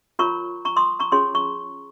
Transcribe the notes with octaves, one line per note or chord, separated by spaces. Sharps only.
F4 A#4 C#5 A#5 C#6
A#5 C#6
C6 D#6
A#5 C#6
C#4 F4 G#4 C#5 C6 D#6
A#5 C#6